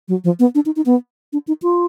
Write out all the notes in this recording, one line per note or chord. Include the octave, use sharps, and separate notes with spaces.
F#3
F3
B3
D4
D#4
D#4
B3
D4
D#4
F4